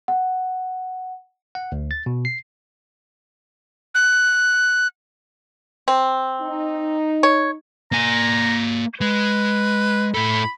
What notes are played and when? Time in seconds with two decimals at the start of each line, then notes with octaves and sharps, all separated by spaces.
0.08 F#5
1.55 F#5
1.72 D2
1.91 A6
2.06 B2
2.25 C7
3.94 F#6
5.88 C4
6.41 D#4
7.23 C#5
7.92 A#3 G#5 A#5
9.01 G#3 B4
10.14 A2 A4 B5